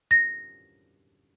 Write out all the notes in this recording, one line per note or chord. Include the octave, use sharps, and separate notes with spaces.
A#6